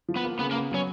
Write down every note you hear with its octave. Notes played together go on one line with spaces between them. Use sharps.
F3
B3 B4
A#3
C#3 B3 B4
A#3 A#4
B3
F#3 C#4 C#5